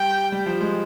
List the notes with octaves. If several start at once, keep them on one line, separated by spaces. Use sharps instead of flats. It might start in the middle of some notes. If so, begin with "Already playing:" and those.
Already playing: G3 G5
G3
F3
G#3